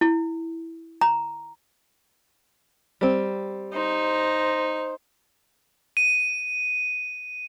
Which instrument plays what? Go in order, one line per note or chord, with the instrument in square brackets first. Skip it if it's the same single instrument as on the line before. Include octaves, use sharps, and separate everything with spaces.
[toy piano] E4
A#5
[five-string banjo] G3 C4
[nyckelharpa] D#4 [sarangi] C5
[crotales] D#7